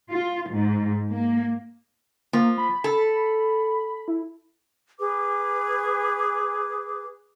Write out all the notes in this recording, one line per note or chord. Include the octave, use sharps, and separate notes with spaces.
F4
G#2
A#3
F3 A#3
B5
A4
E4
G#4 B4 D6